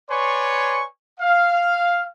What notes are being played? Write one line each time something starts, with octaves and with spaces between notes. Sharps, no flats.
B4 C#5 D5 G#5 C6 C#6
F5